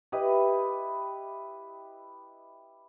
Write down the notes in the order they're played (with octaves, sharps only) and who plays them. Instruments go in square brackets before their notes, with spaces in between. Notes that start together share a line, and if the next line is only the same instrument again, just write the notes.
[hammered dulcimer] E4 G4 B4 D#5